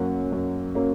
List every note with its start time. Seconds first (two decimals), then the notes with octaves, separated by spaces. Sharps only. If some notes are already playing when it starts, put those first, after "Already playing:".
Already playing: F#2 F#3 A#3 C#4 F#5
0.32 F#2
0.75 F#3 A#3 C#4